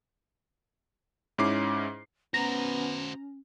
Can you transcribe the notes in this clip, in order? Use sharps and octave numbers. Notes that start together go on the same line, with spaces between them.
G#2 C#4 E4 D6 C7
B3 C#4 F#4 C5 A#5